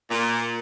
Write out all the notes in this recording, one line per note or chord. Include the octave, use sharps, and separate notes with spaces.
A#2